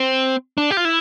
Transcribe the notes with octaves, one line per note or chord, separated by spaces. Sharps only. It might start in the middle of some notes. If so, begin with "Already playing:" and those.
Already playing: C4
D4
G4
F4
E4